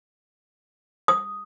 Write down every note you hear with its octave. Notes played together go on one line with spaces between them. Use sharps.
D#6